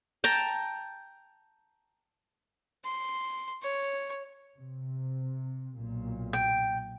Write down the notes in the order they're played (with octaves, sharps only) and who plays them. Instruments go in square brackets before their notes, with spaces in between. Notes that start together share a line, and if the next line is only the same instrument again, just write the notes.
[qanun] G5 A5 A#5
[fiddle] C6
C#5
[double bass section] C3
B1 A#2
[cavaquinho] G5